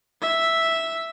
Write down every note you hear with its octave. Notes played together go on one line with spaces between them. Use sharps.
E5